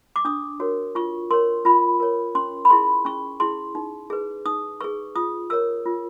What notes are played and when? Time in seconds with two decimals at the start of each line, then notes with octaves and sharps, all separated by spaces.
0.16 D6
0.25 D4 D#6
0.60 F#4 A#4 C#5
0.95 F4 C#6
1.31 A#4 C#5 C6
1.65 F4 B5
2.00 A#4 C#5
2.35 C#4 C6
2.65 B5
2.70 E4 G#4 C6
3.05 C#4 C#6
3.40 E4 G#4 C6
3.75 D#4
4.10 G#4 B4
4.46 D#4 D#6
4.81 G#4 B4 C#6
5.16 F4 D#6
5.50 A#4 C#5 E6
5.85 F4